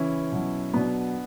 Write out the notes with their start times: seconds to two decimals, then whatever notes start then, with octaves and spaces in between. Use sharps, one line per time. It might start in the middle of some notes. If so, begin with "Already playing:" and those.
Already playing: C#3 E3 C#4 E4
0.32 B2 F#3
0.73 B2 F#3 B3 D4